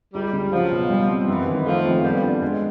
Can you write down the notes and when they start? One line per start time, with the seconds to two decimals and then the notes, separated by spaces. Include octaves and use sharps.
0.14 C#2 G3
0.33 C#3
0.52 F3 F#3
0.71 B2
0.90 G3
1.08 C4
1.28 F#2 E3
1.47 D#3
1.66 F3 A3
1.85 F2
2.04 G3 B3
2.22 D4
2.42 G#3